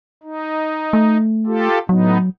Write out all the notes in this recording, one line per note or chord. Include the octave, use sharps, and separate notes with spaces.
D#4
A3
F4 G4 A4
A2 F#3 B3 D#4